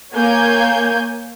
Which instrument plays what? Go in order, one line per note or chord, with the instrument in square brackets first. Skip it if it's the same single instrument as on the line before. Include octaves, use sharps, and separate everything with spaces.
[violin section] A#3 C#5 G#5 G6 G#6